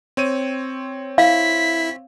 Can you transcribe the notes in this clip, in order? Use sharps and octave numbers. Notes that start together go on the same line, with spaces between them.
C4 C#5 D#7
E4 F5 B6